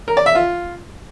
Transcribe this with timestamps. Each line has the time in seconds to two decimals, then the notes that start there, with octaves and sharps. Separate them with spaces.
0.08 A#4
0.17 D5
0.26 E5
0.35 F4